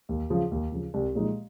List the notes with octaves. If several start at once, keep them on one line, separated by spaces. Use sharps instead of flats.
D#2
C#3 F3
D#2
C#3 F3
C2
A#2 F3 G#3 D#4